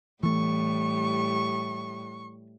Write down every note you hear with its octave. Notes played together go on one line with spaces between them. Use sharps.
A2 E3 G3 A3 C#6